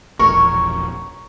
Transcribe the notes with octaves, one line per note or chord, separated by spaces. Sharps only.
E1 A#1 A#4 C#5 C#6